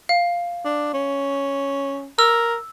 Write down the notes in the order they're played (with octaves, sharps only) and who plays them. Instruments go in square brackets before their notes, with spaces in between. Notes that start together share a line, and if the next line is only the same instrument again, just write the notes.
[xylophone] F5
[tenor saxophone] D4
C#4
[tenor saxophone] A#4 [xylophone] E6